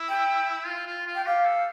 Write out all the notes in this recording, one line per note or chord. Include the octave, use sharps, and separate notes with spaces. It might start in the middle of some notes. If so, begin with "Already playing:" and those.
Already playing: E4
G5
F4
F4
F4
G5
G4 F5
A4